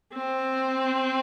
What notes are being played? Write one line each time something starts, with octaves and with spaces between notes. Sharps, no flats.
C4